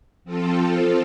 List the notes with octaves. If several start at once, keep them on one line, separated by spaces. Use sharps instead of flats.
F3 C4 F4 A4